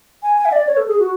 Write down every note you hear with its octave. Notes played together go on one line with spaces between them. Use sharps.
G#5
G#5
E5
D5
C#5
A4
G#4
F#4